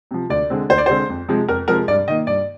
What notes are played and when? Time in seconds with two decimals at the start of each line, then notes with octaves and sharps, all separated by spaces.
0.11 C3 F3
0.30 D2 D5
0.50 D3 G#3 C4
0.69 D2 C5
0.78 D5
0.86 D3 G#3 C4 C5
1.10 F2
1.28 C3 F3 G#3
1.48 F2 A#4
1.68 C3 F3 G#3 A#4
1.88 G2 D5
2.08 D#3 A#3 D#5
2.27 G2 D5